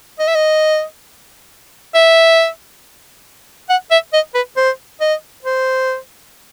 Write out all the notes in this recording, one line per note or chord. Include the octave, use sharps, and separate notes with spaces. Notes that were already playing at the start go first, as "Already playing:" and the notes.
D#5
E5
D#5
E5
F#5
E5
D#5
B4
C5
D#5
C5